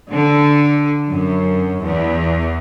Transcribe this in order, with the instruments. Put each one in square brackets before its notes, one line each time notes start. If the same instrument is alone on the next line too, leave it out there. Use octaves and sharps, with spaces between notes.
[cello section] D3
F#2
E2